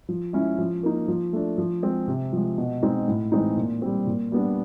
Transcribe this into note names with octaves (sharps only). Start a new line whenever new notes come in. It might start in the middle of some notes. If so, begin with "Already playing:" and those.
F3
G#3 C#4 E4
F3
A#3 D#4
F3
A3 D4
F3
G#3 C4
C3
F3 G#3
B2
G#3 C4 D#4
A2
E3 G#3 C4 D#4
A#2
G3 C4
A#2
G3 B3 D4